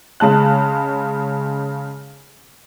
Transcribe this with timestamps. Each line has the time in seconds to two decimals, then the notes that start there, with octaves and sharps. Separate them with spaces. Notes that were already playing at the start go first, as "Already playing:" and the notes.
0.20 C#3 G#3 A5 F#6